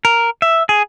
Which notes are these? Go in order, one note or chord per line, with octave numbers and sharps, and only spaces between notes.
A#4
E5
G#4